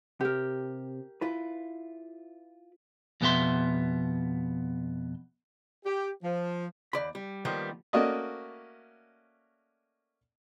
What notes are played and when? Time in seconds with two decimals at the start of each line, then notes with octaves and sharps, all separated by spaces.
0.21 C3 G4 A#4
1.21 E4 F4 B4
3.21 F2 B2 B3 G4 E5 C6
5.85 G4
6.23 F3
6.93 D#2 D5 B5
7.15 G3
7.45 D#3 F3 G3 A#3 B3
7.93 A3 A#3 C#4 F#4 D5 D#5